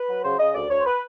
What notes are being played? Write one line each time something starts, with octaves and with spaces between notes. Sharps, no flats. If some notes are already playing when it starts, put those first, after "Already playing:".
Already playing: B4
F#3
C#3 C5
C#3 D#5
D2 D5
D2 C#5
C5
B4